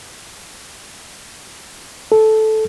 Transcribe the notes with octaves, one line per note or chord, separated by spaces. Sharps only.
A4